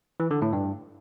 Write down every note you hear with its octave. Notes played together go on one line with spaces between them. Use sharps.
E3
D3
A2
G2